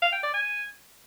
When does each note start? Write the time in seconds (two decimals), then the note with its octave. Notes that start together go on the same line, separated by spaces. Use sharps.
0.02 F5
0.13 G5
0.23 D5
0.34 G#5